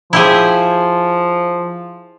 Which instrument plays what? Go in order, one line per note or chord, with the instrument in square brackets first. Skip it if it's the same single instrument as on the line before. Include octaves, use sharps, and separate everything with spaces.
[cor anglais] F3 [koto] E4 G4 G#4